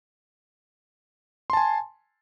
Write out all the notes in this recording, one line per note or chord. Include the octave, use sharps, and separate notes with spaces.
G#5 A5 C6